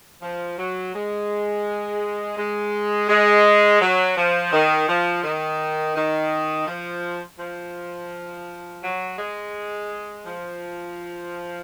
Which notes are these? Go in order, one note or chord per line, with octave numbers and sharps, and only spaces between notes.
F3
F#3
G#3
G#3
G#3
F#3
F3
D#3
F3
D#3
D#3
F3
F3
F#3
G#3
F3